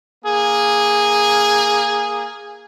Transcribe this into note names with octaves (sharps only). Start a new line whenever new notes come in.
A#3 G#4